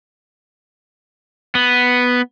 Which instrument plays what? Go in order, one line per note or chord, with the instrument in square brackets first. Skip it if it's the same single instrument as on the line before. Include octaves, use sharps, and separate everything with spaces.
[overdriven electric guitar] B3